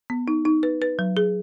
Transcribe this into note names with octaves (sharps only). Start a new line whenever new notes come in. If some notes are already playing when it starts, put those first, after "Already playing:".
B3
D#4
D#4
B4
B4
F#3
G#4